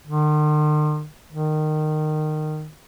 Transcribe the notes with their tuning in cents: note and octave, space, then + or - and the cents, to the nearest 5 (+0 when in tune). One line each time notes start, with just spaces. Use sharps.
D#3 -45
D#3 -20